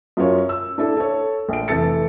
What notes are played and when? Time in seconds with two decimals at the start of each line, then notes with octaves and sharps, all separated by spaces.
0.17 F#2 F4 A#4 C#5
0.49 E6
0.78 D4 E4 A4
0.97 A4 C#5
1.49 A#1 D7
1.68 F1 E3 A4 A6 C#7